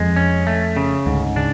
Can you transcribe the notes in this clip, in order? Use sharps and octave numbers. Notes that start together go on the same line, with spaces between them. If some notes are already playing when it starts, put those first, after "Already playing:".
Already playing: F2 F3 G#3
C#4
A3
C#3
D2 G#2 D3
C#3 D4